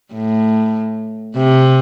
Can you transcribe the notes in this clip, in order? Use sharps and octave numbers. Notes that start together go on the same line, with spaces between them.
A2
C3